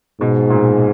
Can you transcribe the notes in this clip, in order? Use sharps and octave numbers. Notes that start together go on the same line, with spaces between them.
G#2 B2
A#2